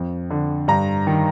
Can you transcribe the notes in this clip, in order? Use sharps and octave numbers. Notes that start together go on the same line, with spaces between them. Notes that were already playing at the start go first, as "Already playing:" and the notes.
Already playing: F2
D3
G2 A#5
D#3